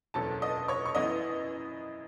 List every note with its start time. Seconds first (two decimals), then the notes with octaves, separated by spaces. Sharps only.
0.14 F#1 E2 B2 F#3 C#4 A4 A5
0.42 D#5 D#6
0.68 C#5 C#6
0.86 C#6
0.95 F#2 E3 B3 E4 D#5 D#6